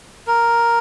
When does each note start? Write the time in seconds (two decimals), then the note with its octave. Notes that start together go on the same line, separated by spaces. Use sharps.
0.27 A#4